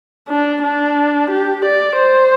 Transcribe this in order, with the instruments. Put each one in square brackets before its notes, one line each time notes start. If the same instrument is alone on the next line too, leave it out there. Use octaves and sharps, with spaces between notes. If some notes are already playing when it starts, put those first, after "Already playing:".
[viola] D4
D4
G4
D5
C5